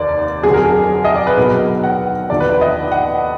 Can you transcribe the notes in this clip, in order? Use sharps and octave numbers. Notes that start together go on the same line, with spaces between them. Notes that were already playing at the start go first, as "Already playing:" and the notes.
Already playing: F1 D#2 D#3 D5
F1 F2 D3 F#3 G#4
A#4
G#4
D#5
D5
B4
B1 B2 F#3 A#4
F#5
D#2 D3 F3 D5
B4
D5
D#5
F#5